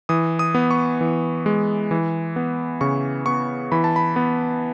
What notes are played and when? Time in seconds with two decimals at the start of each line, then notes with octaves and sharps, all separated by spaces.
0.09 E3 D#6
0.39 D#6
0.55 B3
0.71 C#6
1.01 E3
1.46 G#3
1.91 E3
2.36 B3
2.81 C#3 C#6
3.26 B3 C#6
3.72 E3 B5
3.84 A5
3.96 B5
4.16 B3